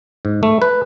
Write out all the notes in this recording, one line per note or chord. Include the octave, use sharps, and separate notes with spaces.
G#2
A3
B4